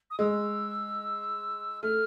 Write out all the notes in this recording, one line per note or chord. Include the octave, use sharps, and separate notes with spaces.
D#6
G#3 E6
A3 F6